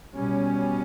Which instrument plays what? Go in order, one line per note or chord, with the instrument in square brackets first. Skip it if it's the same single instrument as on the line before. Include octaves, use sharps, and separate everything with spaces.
[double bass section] B2 G3 C#4